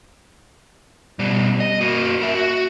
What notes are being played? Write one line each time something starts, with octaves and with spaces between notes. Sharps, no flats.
B2 G3
D#5
A#3 F#4
A#4 E5
F#4